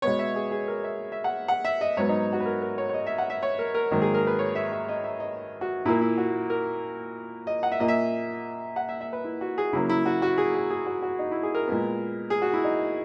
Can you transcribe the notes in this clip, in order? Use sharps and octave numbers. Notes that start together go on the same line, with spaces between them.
B2 G#3 B3 C#5
E5
G#4
G#4
A#4
E5
E5
F#5
F#5
E5
D#5
G#2 F#3 B3 C#5
D#4
F#4
B4
A#4
A#4
C#5
C#5
D#5
E5
F#5
E5
C#5
A#4
A#4
G#2 D#3 F#3 A#3
G#4
A#4
B4
C#5
E5
E5
D#5
E5
D#5
F#4
A#2 A#3 E4
E4
F#4
A#4
D#5
F#5
E5
A#2 A#3 D#5
E5
F#5
E5
E5
B4
E4
F#4
G#4
C#3 F#3 A#3 E4
E4
F#4
F#4
G#4
G#4
G#4
F#4
F#4
D#4
E4
G#4
A#4
A#2 G#3 B3
G#4
F#4
E4
D#4